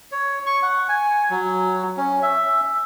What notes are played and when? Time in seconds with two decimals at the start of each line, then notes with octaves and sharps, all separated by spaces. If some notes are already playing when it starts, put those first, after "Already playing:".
0.12 C#5
0.46 C#6
0.63 F#5
0.89 G#5
1.30 F#3
1.97 C#4
2.22 E5